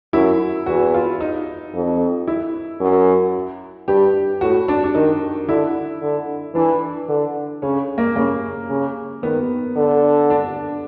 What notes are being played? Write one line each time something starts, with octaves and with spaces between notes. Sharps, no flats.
F#2 E4
E2 F#4
F4
D#4
F2
E4
F#2
G2 G4
A2 F#4
D4
D4
D#3 D#4
D3 E4
D3
E3 D4
D3
C#3 C#4
A#3
C#3 A#3
C#3
D#3 B3
D3
D4